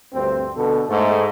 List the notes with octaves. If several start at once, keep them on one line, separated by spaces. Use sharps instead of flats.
D2 G2 C4
B2 D3 A4
G#2 A3